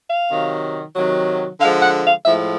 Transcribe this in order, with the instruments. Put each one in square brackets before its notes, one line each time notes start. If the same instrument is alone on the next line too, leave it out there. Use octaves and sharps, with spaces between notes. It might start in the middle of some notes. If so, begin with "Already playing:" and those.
[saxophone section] F5
C3 D#3 F#3
C3 D#3 F#3
D3 F3 G#3 F5
F#5
F5
A2 F3 G#3 E5